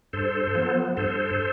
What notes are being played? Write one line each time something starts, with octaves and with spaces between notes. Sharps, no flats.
G2 A4 C5
F3 B3
G2 A4 C5